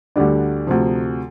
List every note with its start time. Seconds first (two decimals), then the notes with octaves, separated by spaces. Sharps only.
0.16 D2 D3 G3 D4
0.67 D2 C3 F3